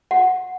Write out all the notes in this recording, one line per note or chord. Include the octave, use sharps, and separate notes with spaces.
F#5